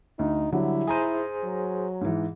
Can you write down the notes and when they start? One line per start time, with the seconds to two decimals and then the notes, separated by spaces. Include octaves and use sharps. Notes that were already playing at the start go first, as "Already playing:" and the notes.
0.19 D2 D#4
0.52 D3 F#3 G3 E4
0.87 G#4 C5 G#5 A#5 D#7
1.43 F#3
2.01 G#2 E3